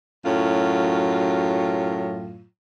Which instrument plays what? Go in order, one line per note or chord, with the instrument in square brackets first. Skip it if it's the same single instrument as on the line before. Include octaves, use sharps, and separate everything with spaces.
[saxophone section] F#2 A2 F#3 F4